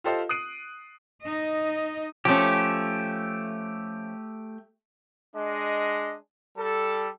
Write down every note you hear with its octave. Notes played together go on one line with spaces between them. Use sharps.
F4 G4 A4 C5 D#5 F5
D#6 F#6 C7 D7 D#7
D#4 D#5
F3 A3 C#4 G4
G#3 D4 D#5
G3 A4